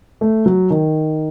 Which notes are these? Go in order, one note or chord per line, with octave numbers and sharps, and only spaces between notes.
A3
F#3
D#3